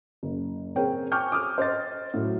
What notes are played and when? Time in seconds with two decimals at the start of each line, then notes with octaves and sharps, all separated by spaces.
0.23 F#1
0.76 C4 G#4 A#4 C#5 G5
1.12 G5 G#5 C#6 D6 F6 G6
1.32 D6 D#6 F6
1.58 C5 D#5 A6
2.14 A2 F#3